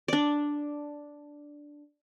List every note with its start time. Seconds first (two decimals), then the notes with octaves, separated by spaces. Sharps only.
0.08 D4 D5